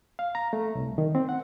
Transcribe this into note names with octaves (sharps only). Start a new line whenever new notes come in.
F5
A#5
A3
C2
D#3
C4
F#5